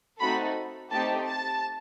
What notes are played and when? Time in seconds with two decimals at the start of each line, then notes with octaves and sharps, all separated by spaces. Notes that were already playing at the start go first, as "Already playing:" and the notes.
0.20 A3 C4 D#4 F#4 A4 B5
0.91 A3 C4 D#4 G4 A5
1.27 A5